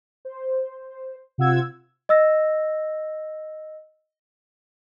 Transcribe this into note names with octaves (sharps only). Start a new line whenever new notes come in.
C5
C3 F4 F#5 E6 G#6
D#5 E6 A#6